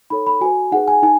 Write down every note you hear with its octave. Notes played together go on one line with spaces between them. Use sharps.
D#4 A4 C#5 B5
B5
F#4 B4 G#5
D#4 G#4 B4 F#5
G#5
D#4 G#5